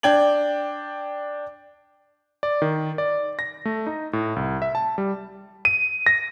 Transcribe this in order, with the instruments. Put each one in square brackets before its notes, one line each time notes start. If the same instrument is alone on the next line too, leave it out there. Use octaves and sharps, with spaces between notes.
[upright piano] D4 G5 G#6 F#7
[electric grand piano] D5
D#3
D5
A#6
A3
D#4
A2
C2
E5
A5
G3
D#7
A#6